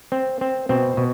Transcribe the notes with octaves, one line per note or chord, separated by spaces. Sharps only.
C4
C4
B2 C4
B2